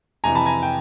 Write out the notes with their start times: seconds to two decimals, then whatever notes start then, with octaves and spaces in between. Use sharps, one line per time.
0.24 F2 C3 E3 G#5 A#5
0.35 A5 B5
0.46 G#5 A#5
0.62 G5